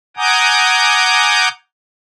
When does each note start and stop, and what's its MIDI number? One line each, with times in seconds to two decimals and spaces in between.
0.17 1.49 78
0.17 1.49 80
0.17 1.49 82
0.17 1.49 86
0.17 1.49 87
0.17 1.49 91